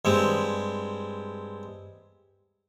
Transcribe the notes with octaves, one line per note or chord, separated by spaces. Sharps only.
G2 G#3 C4